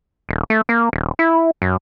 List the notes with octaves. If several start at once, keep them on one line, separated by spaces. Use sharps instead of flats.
D#1
A3
A#3
D#1
E4
F#2